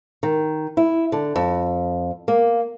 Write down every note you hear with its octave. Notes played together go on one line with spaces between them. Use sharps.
D#3
E4
D3
F2
A#3